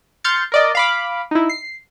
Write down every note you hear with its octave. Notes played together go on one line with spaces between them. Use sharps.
C6 F6 G6 A6 C#7
A#4 D5 D#5
F5 B5 D6
D#4 E4
C7